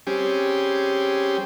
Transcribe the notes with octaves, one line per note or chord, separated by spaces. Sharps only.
G3 C4 C#4 G4 G#4